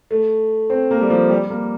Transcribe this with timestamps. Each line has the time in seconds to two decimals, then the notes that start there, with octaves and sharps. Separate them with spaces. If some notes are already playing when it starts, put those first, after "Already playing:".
0.11 A3
0.70 C4
0.91 A#3
1.01 G3
1.10 F3
1.30 G3
1.50 A#3